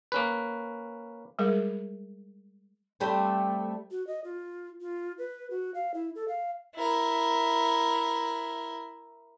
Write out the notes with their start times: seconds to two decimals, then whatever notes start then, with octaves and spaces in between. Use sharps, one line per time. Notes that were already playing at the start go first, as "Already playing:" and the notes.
0.12 A#3 C#4 B4
1.39 G3 G#3 G#4 A#4
3.00 G3 A3 C4
3.91 F#4
4.07 D#5
4.24 F4
4.81 F4
5.18 B4
5.50 F#4
5.74 F5
5.94 E4
6.15 A4
6.28 F5
6.75 E4 A#4